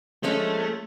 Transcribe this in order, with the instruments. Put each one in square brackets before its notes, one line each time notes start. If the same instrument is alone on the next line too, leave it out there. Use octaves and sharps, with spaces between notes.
[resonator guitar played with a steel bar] F3 G#3 C#4 [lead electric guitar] A3